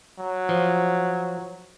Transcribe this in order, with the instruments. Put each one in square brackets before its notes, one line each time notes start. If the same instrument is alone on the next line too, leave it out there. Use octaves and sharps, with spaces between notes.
[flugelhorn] F#3
[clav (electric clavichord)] F3